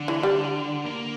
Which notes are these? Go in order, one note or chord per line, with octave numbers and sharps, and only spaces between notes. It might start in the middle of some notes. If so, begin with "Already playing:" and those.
Already playing: D3
E3
G3
A#3